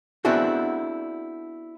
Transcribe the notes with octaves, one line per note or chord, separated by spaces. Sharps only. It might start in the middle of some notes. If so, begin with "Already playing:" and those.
B3 C4 D4 E4 F#4 G#4